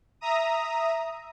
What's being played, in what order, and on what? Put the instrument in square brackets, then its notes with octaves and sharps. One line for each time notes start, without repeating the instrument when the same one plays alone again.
[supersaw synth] E5 A#5 D#6